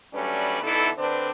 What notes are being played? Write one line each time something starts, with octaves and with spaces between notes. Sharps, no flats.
F#3 G3 A3 C#4 D4 B4
B2 D3 E3 D#4 E4 A4
D3 C4 D4 B4 C5